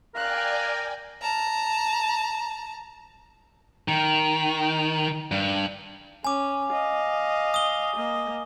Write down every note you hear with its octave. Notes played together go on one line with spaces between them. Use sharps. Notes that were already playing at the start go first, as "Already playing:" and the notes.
A#4 D5 F5 G5 G#5 F#6
A5 A#5
D#3
G2
C#4 G#5 D6
D#5 F5
D#6 G7
A#3 D#5